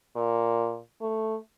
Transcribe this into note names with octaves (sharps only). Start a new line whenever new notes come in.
A#2
A3